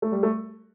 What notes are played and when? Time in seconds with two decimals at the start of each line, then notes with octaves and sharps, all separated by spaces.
0.02 A3
0.12 G3
0.23 A3